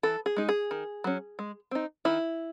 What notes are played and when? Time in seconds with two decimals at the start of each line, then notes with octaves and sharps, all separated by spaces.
0.03 E3 A4
0.26 G#4
0.37 G#3 D#4
0.49 G#4
0.71 D#3
1.04 F#3 C#4
1.39 G#3
1.71 C4 D#4
2.05 D#3 E4